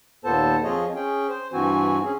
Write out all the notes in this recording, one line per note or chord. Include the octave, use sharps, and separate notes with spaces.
D#2 A#2 B3 A4 C5 A5
F2 F3 F4 G#4 C#5 D#5
C#4 G#4 G5
C5
G2 E3 C4 F#4 G#5
C#4 G#4